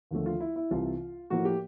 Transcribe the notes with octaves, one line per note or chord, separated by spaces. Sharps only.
D#2 D3 F3 A3
F4
E4
E4
C2 C3 E3 F4
A2 F3 A#3 F#4
G4